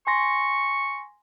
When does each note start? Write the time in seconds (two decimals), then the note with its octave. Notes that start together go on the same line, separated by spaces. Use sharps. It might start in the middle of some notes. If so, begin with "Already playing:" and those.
0.07 G#5 C6 C#6 A#6